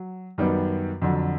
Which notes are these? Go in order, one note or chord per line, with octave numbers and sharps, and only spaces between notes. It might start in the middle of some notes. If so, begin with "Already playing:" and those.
Already playing: F#3
F#2 D#3 G3 B3
F2 D3 F#3